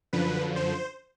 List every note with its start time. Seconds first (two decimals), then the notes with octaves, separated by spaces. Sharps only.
0.13 F#2 D3 F3 B4
0.56 C5